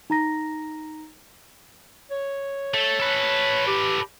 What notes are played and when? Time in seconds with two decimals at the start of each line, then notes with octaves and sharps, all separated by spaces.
0.10 D#4 A#5 A#6
2.11 C#5
2.74 A3
3.00 A4 B4
3.67 G4